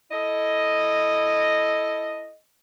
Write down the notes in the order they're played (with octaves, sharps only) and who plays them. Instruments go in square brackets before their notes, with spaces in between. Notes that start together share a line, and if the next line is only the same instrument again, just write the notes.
[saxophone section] E4 A4 D#5